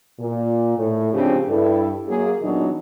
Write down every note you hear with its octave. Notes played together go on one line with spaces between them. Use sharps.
A#2
A2
G#2 C#3 F3 C4 D4 G4
G2 E4 A4
F#2 A#3 G#4
A#2 E3 F#3 B3 D4 D#4